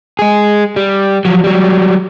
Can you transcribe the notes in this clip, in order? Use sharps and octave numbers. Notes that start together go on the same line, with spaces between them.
G#3 G#4
G3
F3 F#3
F#3 G3